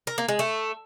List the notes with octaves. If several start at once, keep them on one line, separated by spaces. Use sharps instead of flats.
A#4
A#3
G#3
A3